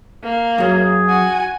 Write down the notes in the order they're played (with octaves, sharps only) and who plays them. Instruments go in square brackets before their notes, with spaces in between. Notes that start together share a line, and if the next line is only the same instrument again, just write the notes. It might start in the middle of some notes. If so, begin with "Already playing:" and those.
[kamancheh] A#3
[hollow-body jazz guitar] F#2 F#3 [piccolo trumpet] G#4
[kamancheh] F#4 G#5